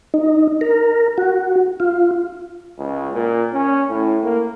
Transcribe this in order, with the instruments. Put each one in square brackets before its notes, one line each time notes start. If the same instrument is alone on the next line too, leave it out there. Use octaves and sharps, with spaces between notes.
[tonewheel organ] D#4
A#4
F#4
F4
[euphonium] C#2
A#2
C#4
A2
A#3